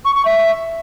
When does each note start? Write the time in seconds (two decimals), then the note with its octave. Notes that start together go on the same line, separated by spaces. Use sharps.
0.05 C#6
0.15 C#6
0.25 E5